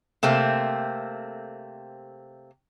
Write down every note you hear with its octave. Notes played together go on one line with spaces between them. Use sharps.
C3 A3 A#3 C4